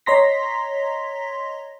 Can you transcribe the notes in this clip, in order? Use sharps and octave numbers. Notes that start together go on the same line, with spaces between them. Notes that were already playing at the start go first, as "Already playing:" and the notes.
C#5 D#5 A#5 C6 A#6 B6